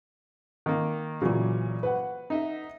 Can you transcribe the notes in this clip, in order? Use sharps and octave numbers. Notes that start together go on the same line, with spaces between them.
D#3 A#3
A#2 C#3 E3 F#3
B4 F#5
D#4 D#5 E5